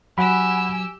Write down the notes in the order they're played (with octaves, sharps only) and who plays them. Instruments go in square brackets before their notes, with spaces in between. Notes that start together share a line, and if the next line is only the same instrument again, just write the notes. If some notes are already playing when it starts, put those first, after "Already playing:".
[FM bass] F#3 [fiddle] G4 E6 [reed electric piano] F#5 B5 [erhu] G#5